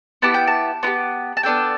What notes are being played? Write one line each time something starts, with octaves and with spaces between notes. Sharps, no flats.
B3 E4 G4 A5
G5
A5
B3 E4 G4
A5
B3 D4 A4 G5